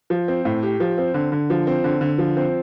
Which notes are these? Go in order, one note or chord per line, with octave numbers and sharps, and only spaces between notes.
F3
C4
A2
G4
F3
C4
D3
D3
F3
C4
D3
D3
F3
C4